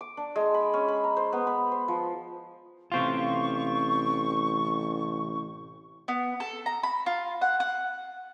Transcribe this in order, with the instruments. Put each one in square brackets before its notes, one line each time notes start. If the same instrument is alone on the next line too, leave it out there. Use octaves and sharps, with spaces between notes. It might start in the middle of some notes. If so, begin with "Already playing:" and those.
[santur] D6
D4
G#3
B5
C#4
B5
A#5
C5
B3
B5
C5
F3
[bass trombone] A1 [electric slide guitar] C3 C4 F4 [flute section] C#6
[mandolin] B3
A4
A#5
B5
F4
F#5
F#5